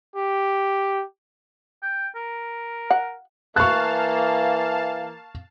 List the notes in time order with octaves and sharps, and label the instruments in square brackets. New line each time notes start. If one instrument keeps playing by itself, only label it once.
[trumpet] G4
[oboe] G5
A#4
[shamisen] F#5
[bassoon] E3 [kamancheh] A#3 [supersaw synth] F5 A5 [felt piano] C#6 F#6